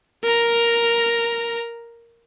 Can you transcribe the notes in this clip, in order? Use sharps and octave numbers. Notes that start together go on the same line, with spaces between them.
A#4 A#5